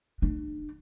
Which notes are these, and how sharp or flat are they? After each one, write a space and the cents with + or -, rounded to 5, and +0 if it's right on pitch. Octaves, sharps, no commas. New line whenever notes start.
D4 +40